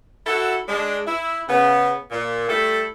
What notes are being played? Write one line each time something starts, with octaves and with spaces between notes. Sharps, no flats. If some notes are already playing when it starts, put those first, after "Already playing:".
E4 F#4 A4
G#3 D4
E4
C#3 B3
A#2
G3 A3 E4 A4